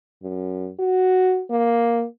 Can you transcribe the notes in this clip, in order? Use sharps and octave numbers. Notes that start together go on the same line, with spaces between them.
F#2
F#4
A#3